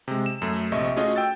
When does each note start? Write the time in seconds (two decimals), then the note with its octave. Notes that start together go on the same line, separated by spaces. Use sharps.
0.08 C3 G#3
0.26 E7
0.42 F#2 A3
0.72 A#1 C3 D#5 E5 C#6
0.96 A3 C#4 F4 F#4 G#4 D#5
1.16 G5 E6 A6